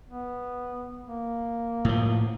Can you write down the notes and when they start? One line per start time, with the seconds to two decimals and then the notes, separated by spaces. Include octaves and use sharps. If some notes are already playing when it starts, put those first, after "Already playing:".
0.08 B3
1.08 A#3
1.85 A2 F3